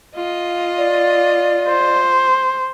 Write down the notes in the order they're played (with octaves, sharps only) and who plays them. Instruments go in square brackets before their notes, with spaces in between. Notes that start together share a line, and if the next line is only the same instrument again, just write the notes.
[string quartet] F4 D#5 F5
[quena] D5
[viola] C5